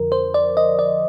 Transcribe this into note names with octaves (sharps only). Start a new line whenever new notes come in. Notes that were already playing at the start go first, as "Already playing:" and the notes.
Already playing: F2 D3 F3 A#4
C5
D5
D#5
D5